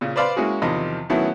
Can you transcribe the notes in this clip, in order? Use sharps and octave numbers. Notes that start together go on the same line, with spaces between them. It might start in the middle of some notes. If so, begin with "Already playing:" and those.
A#2 C#3
B4 C5 D5 F5 B5 C6
G#3 A#3 C#4 E4 F#4 G#4
E2 C3 D#3 F3 D#5 B5
D#3 F#3 A3 B3 C#4 E4